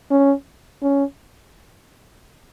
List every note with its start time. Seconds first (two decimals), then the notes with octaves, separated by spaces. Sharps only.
0.11 C#4
0.83 C#4